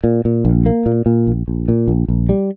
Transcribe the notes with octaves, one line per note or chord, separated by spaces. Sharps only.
A#2
A#2
A#1
A#3
A#2
A#2
A#1
A#1
A#2
A#1
A#1
G3